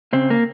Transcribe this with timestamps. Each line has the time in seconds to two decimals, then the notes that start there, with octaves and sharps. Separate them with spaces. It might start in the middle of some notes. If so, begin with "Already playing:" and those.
0.13 C#3 C4
0.30 A#3